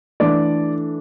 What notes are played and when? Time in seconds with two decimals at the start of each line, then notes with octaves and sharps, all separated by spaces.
0.20 E3 A3 D4 D5